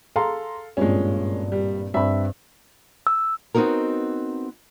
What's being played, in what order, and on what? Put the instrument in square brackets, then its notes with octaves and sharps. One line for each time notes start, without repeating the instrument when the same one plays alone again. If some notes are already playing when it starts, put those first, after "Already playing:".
[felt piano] G#4 A#5 C6 [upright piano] A4 F5
[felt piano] G#1 G2 A#2 [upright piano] G#3 C#4
[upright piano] G3
[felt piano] G2 C4 [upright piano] E5 B5
[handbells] E6
[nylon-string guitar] B3 C4 D#4 F#4 A#4